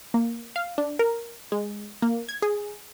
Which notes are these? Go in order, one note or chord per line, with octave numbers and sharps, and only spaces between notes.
A#3
F5
D4
A#4
G#3
A#3
G#6
G#4